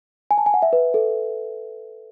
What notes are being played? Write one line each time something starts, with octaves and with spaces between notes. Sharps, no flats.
G#5
A5
G#5
F#5
E5
B4
A4